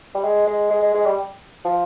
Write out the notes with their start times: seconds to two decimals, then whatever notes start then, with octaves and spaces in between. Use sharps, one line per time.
0.15 G3
0.24 G#3
0.47 G#3
0.70 G#3
0.82 G#3
0.94 G#3
1.06 G3
1.65 F3